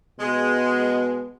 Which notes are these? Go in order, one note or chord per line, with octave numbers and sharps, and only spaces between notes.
B2 G#3